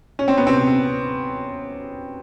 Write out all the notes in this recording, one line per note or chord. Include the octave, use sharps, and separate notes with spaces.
C#4
C4
B3
C3 C4